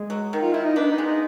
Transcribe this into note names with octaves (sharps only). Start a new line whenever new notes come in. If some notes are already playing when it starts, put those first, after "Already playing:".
Already playing: G#3
F#3
D#3
F4
D#3 E4
D#4
B3 D4
D#4
G#3
D#4